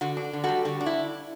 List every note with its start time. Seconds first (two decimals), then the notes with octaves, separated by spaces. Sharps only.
0.01 D3 F#4
0.17 D4
0.33 D3
0.44 G3 F#4 A4
0.65 D3 F#4
0.81 D4
0.86 E4